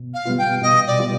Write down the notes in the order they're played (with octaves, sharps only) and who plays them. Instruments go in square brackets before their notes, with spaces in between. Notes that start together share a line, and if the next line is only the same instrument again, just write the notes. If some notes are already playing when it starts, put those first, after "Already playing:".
Already playing: [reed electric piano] B2
[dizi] F5
[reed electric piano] G3 B3 F4
[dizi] G5
[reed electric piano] B2 [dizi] D#5
[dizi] D5
[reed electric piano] G3 B3 F4